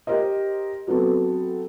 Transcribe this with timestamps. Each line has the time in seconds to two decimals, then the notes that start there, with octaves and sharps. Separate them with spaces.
0.07 G4 A#4 C5 D#5
0.87 F#3 B3 C4 A4